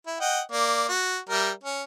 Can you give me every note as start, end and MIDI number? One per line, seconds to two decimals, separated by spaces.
0.07 0.16 64
0.20 0.41 75
0.20 0.41 78
0.20 0.41 79
0.52 0.88 58
0.52 0.88 74
0.89 1.19 66
1.30 1.50 55
1.30 1.50 70
1.30 1.50 76
1.64 1.83 61